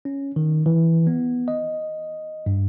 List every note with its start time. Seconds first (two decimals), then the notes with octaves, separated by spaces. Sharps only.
0.05 C#4
0.36 D#3
0.66 E3
1.07 B3
1.48 D#5
2.46 G2